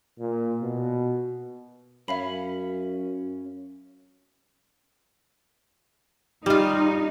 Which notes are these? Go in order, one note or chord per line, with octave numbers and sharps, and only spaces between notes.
A#2
B2
F#2 C#4 E5 F5 B5
G3 D#4 F4